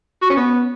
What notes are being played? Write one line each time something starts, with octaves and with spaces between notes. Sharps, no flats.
F#4
C#4
B3